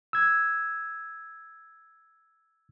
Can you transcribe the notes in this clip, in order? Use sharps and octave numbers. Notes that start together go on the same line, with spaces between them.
E6 G#6